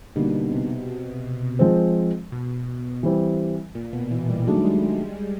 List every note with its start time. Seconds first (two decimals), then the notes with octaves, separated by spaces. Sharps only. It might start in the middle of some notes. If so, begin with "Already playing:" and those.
0.15 B2 D3 G3 A#3 D#4
0.51 C3
0.87 C3
1.59 F3 G#3 C4
2.32 B2
3.03 E3 G3 C4
3.75 A#2
3.93 B2
4.11 E3
4.30 G3
4.47 D#3 F#3 G#3 A3 D4 F#4
4.56 G3
4.64 G#3